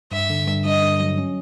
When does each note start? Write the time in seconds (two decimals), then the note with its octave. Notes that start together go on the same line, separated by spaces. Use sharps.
0.12 G2 E5
0.30 D3
0.47 G2
0.65 G2 D#5
0.83 D3
1.00 F#3
1.18 C#4